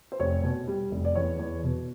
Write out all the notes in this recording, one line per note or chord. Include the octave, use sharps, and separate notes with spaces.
C5
F1 C#5
B2
G3
F1
D5
E2 C#5
E2
B2